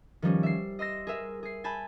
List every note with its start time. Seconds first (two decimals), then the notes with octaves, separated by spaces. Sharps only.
0.22 D#3 F3 G3 C#4
0.43 E5 C7
0.79 D#5 C6 E6 A#6
1.07 G#4 A#4 E5
1.43 G#4 C7
1.64 G#5 A5 B5 G6